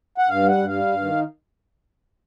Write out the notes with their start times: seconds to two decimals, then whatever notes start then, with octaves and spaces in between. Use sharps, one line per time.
0.18 F#5
0.29 G2 F5
0.43 G3
0.48 F#5
0.58 G2
0.68 F5
0.73 G3
0.88 G2
1.02 D#3